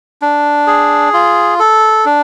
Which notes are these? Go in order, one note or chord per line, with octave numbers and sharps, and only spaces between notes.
D4
G#4
F4
A4
D4